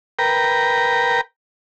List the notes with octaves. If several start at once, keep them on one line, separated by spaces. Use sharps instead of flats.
A#4 B4 G5 A#5